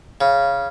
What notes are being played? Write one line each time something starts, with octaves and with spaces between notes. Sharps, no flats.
C#3